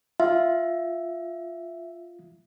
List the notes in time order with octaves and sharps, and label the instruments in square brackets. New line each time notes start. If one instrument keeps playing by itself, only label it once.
[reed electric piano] F4 [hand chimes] E5